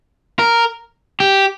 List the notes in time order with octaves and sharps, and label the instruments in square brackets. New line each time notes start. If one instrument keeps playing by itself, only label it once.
[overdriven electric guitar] A#4
G4